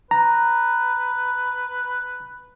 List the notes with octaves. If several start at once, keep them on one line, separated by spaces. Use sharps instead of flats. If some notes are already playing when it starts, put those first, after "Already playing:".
B4 A#5